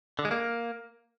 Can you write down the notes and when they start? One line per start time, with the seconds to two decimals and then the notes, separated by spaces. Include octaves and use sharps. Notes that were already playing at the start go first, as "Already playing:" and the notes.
0.19 D3
0.25 G#3
0.31 A#3